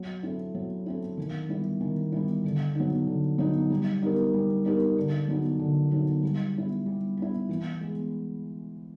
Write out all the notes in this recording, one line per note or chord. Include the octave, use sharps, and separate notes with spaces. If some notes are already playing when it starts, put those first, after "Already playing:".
Already playing: F#3
A3 C4 E4
F#3
A3 C4 E4
D#3
G3 B3 E4
D#3
G3 B3 E4
D3
F#3 B3 D#4
D3
F#3 B3 D#4
G3
B3 D#4 G4 A#4
G3
B3 D#4 G4 A#4
D3
F#3 B3 D#4 F#4
D3
F#3 B3 D#4 F#4
G3
B3 E4
G3
B3 E4
E3
G#3 B3